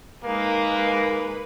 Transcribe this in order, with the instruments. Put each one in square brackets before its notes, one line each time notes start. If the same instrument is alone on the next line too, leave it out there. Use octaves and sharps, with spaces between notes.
[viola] G#3 B4 [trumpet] A#3 [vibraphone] D#4 A#4